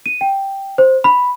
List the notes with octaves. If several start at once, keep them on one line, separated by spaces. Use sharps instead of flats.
D#7
G5
C5
B5